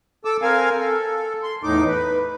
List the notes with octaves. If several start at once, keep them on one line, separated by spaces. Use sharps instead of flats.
A4 D6 E6
C4 A#4 F5 G#5
A4
C6
E2 A2 D#4 D6
B4